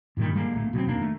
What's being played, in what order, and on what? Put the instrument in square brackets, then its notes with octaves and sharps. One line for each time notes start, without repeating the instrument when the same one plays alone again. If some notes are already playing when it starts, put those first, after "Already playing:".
[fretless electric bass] G2 A#2 D#3 G3
D3 G3 G#3 A#3
D1 A#1 A3 A#3
B2 F#3 B3 C4
F1 D#2 A#3 D4
A3